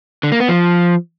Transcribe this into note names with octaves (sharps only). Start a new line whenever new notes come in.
D3
A#3
B3
F3